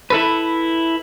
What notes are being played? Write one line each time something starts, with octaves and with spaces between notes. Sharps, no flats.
E4 A4 B4